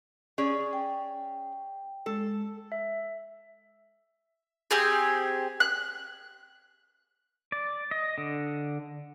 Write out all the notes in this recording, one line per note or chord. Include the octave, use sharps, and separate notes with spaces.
C#4 G#4 D5
G5
G#3 A4
E5
C4 G4 G#4
F#6
D5
D#5
D3